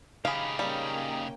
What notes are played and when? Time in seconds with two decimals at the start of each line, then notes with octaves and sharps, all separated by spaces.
0.25 C#3 D#4 G4 G#4 F5 B5
0.59 G3 A#3 C#4 D#4 G5